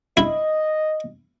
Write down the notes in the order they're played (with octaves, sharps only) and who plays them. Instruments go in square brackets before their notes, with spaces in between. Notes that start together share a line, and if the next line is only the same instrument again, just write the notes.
[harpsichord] E4 [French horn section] D#5